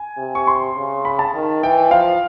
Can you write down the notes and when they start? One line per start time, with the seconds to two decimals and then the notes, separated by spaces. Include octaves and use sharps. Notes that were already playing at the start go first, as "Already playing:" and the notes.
Already playing: G#5
0.18 C3
0.35 C#6
0.47 C6
0.77 C#3
1.05 B5
1.19 A5
1.34 D#3
1.63 E3 G5
1.91 F3 F5